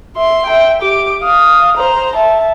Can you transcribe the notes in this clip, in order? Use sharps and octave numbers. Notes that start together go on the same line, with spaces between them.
E5 C6
E5 G5
G4 D6
F5 D#6
C5 A#5
E5 A5